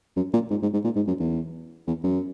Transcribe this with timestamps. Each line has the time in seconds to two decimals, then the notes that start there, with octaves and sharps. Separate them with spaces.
0.16 F#2
0.33 A#2
0.51 G#2
0.62 G#2
0.73 G#2
0.84 A#2
0.96 G#2
1.07 F#2
1.19 E2
1.87 E2
2.04 F#2